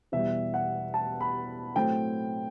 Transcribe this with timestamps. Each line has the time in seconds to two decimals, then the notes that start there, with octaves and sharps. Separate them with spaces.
0.12 E2 B2 G3 E5
0.54 F#5
0.94 A5
1.21 B5
1.76 A2 F#3 A3 C4 G5